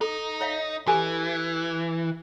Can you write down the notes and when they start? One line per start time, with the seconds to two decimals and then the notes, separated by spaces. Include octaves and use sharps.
0.01 D#4 A4
0.41 C#5 E5 F5
0.87 E3 G4 A4 G#5